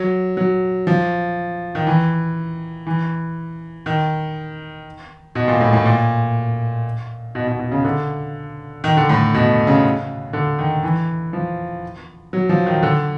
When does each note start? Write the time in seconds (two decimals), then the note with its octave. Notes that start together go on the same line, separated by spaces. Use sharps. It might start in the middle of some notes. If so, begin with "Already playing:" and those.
Already playing: F#3
0.37 F#3
0.87 F3
1.75 D#3
1.87 E3
2.87 E3
3.86 D#3
5.35 B2
5.48 A#2
5.60 A2
5.73 A2
5.86 A#2
7.35 B2
7.47 B2
7.59 B2
7.72 C#3
7.84 D3
8.84 D#3
8.97 D3
9.09 A2
9.34 B2
9.67 C#3
10.33 D3
10.59 D#3
10.83 E3
11.33 F3
12.33 F#3
12.49 F3
12.66 D#3
12.83 D3